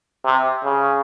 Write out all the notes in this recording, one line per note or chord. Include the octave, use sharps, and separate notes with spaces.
C3
C#3